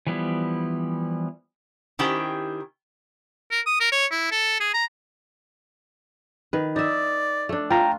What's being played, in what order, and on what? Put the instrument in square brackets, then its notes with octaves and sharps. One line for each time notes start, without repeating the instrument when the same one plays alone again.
[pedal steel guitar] E3 F3 G3 B3 E4
[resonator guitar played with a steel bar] D#3 C#4 E4 G4 C5 G5
[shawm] A#4
D#6
A#4
C#5
E4
A4
G#4
A#5
[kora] D#3 B4
[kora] D#4 E5 [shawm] D5
[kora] A3 D4
[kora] F4 [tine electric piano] G5 A#5